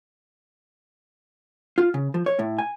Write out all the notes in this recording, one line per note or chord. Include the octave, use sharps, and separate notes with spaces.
F4
C#3
F3
C#5
A2
G#5